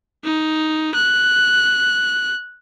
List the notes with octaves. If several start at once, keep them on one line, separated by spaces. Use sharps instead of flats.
D#4
F#6